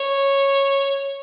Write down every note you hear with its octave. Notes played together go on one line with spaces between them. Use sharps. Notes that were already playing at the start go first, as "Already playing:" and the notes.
Already playing: C#5